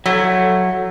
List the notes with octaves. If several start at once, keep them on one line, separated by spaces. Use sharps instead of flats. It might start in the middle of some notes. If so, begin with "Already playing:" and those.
F#3 A3 E4